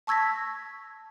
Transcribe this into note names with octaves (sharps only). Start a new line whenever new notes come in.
A5 C#6 E6 G#6 A#6 B6